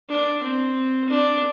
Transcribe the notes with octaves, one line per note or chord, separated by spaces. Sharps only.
D4
C4
D4